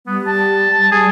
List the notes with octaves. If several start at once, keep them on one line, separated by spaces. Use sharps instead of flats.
G3 B3
A5
G3 G#4